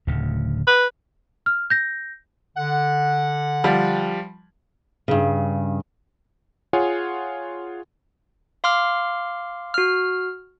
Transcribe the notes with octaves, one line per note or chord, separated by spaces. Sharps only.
D1 D2 C#3
B4
F6
G6 A#6
D3 F#5
F3 G3
G2 C#3
F4 G#4 C#5 F#5 G#5
F5 C6 D6 F6
F#4 F6